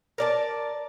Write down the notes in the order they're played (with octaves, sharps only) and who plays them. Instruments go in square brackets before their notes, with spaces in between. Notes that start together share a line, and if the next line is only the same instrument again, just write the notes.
[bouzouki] A#4 D5 A5